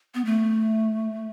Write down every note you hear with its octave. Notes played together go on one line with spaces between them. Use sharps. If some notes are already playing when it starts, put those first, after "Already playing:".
B3
A3